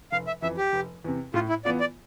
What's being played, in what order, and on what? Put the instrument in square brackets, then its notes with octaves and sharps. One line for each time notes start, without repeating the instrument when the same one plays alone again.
[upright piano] F1 [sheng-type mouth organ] F5
[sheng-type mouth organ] E5
[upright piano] F2 E3 [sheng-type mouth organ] E5
[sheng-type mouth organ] G4
[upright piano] F1
E2 C3
[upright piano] A2 [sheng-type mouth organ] F4
[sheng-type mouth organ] E4
[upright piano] E3 B3 F4 [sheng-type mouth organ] D5
[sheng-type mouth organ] D5